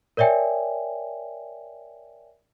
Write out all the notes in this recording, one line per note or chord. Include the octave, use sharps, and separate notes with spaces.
A#4 C#5 D5 E5 G5 G#5